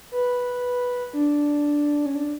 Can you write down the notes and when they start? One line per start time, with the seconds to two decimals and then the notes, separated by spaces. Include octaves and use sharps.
0.12 B4
1.13 D4
2.06 C#4
2.15 D4